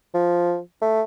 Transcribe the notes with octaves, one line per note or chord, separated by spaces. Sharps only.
F3
A3